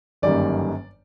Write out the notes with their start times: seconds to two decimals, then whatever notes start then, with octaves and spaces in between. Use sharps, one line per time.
0.22 G1 F#2 D#3 G3 A#3 D5